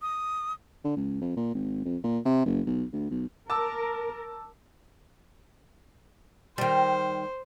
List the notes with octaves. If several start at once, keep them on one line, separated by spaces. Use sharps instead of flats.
D#6
D3
C#2
F2
A#2
G#1
F2
A#2
C3
F#1
B1
D2
B1
A#4 A5 D6 E6
D#3 G3 C5